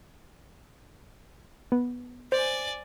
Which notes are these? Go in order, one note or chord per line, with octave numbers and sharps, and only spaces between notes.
B3
C5 D5 G#5